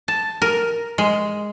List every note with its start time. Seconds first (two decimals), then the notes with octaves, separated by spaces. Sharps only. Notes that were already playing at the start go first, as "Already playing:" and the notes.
0.08 A5
0.42 A#4
0.98 G#3